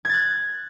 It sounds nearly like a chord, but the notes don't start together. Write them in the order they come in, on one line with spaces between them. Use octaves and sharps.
G#6 A6 F#6